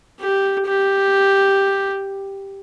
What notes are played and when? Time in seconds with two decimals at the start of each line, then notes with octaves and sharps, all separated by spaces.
0.21 G4
0.66 G4